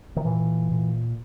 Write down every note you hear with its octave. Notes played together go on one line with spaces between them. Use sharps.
D#3
A#2 E3
A#2